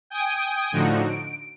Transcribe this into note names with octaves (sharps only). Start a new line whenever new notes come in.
G5 G#5 D#6 D7
A2 D3 F3 D#4 F#4
D7